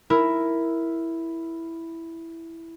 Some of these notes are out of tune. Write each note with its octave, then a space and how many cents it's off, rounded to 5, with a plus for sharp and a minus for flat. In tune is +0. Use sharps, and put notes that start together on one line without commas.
E4 +0 A#4 +0